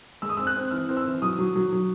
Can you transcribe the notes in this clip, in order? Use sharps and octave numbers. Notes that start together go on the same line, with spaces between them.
G#3 E6
D#6
C4 E6
F#6
C4
E3 F6
C4
E6
E3
F#3 D#6
F#3
F#3
F#3